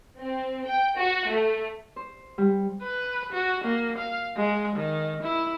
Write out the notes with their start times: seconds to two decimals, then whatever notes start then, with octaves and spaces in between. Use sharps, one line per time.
0.19 C4
0.66 G5
0.97 F#4
1.28 A3
1.96 C5
2.38 G3
2.83 B4
3.32 F#4
3.64 A#3
3.98 F5
4.36 G#3
4.76 D#3
5.23 E4